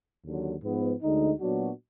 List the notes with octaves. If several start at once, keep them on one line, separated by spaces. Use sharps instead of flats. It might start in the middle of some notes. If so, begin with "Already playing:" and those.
D#2 D3 F#3
G#2 F3 B3
D2 D3 G#3 D#4
A#2 F#3 B3 D4 F#4